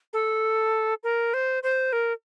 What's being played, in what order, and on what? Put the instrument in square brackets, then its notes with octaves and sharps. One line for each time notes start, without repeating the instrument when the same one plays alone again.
[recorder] A4
A#4
C5
C5
A#4